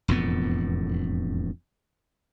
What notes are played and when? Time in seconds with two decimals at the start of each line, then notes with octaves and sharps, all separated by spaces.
0.08 E1 F2 A2 B3